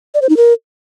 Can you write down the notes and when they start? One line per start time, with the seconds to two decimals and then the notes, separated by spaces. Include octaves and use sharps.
0.14 D5
0.22 C5
0.29 D#4
0.37 A#4